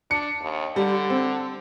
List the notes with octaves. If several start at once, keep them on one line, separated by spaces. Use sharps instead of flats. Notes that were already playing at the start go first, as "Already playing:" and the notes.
D4 C#7
D#2
D3 G3
C4